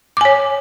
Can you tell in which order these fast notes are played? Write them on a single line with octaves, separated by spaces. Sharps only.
D6 G#5 C#5